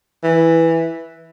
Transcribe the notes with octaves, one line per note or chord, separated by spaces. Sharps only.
E3